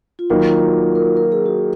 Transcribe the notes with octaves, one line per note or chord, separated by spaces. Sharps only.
F4
D#3 F#3 A#3 D#4
F4
F#4
F#4
A#4
A#4
G#4
F#4